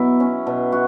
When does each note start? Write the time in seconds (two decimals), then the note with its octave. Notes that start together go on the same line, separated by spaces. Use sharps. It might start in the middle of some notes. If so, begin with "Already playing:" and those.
Already playing: B2 F#3 B3 E4
0.20 C#4
0.47 B2
0.72 F#4